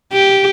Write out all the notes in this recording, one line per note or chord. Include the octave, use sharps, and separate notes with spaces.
G4